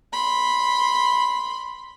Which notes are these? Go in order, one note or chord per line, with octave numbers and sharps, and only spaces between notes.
B5 C6